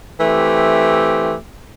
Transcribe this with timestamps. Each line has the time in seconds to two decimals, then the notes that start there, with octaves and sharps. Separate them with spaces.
0.20 E3 A3 C4 G4